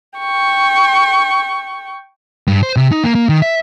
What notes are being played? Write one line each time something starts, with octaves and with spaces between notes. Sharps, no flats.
G5 C#6
G2
C5
C3
D#4
A#3
A#3
D#3
E5